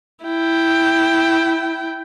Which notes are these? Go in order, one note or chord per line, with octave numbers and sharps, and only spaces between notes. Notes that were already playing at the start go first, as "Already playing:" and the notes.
E4 G5